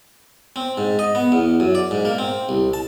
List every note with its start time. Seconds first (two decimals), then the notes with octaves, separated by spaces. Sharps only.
0.56 C4
0.78 G#2
0.99 D#5
1.15 B3
1.32 E2
1.60 F#2
1.75 D5
1.91 G#2
2.05 A#3
2.18 C4
2.49 C2
2.73 A5